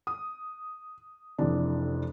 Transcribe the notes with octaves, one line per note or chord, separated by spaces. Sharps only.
D#6
F1 F2 E3 D4